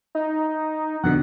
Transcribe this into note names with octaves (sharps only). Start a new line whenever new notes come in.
D#4
F2 B2 D3 F#5